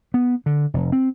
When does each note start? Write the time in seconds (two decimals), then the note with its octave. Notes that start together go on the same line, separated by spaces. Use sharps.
0.14 B3
0.46 D3
0.74 F1
0.92 C4